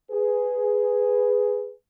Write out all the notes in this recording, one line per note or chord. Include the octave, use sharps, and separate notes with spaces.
G#4 B4